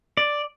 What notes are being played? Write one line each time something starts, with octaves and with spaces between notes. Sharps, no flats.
D5